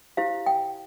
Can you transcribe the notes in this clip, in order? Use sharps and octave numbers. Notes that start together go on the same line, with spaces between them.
E4 G4 C5 F5
G5